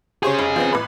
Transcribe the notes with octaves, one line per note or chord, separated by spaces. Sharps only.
C#4 G4 G#4 C5 C#5
F1
F3 B3 C4
A1 B4 B5